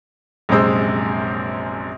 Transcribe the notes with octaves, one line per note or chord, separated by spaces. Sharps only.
A#1 F#2 C3 G#3 C5 E6